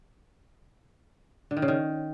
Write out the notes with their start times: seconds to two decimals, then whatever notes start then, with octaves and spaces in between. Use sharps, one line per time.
1.51 D3
1.57 D#3
1.62 C#3
1.68 D#3